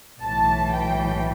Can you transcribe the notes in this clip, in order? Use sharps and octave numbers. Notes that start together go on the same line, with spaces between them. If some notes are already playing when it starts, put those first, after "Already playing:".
B1 A2 E3 A5
G5